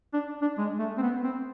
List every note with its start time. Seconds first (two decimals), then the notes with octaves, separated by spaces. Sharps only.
0.13 D4
0.42 D4
0.58 G#3
0.79 A3
0.98 C4
1.03 B3
1.24 C4